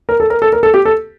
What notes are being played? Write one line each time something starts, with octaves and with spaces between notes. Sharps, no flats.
A#4
A4
A#4
A4
A#4
A4
G4
A4